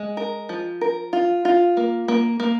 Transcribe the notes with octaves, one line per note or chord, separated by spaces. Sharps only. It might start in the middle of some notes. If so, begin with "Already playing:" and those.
Already playing: G#3
A#4
F3
A#4
F4
F4
A#3
A#3
A#3